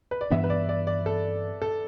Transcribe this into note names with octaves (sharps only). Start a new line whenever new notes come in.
B4
D5
G2 E3 B3 D4 E5
B4
D5
D5
D5
A4
A4